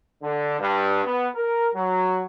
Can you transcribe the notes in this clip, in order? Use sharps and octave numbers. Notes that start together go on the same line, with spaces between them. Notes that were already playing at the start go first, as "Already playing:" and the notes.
D3
G2
B3
A#4
F#3